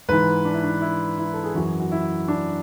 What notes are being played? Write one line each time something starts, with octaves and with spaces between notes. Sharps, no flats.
G#2 E3 B4
D4
E4
D4
E4
E4
A4
G#4
F#2 E3 F#4
F#4
E4
D4